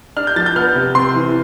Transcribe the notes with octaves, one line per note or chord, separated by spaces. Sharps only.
D4 F6
G6
F3 A6
G6
B3 F6
C3
C4 C6
E3